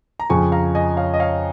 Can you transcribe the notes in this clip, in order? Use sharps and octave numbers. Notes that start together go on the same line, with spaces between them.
A#5
F2 C#3 F3 G#5 C#6
F5 A#5
D#5 G#5
C#5 F5
D#5
C#5 F5